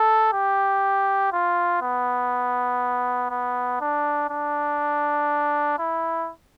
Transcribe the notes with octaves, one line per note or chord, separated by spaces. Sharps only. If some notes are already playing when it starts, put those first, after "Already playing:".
Already playing: A4
G4
F4
B3
B3
D4
D4
E4